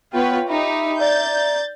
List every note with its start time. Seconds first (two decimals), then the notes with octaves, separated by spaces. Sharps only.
0.13 B3 F4 B4 C#5 G5
0.49 D#4 G4 E5 B5
1.00 D5 A#5 G6 A6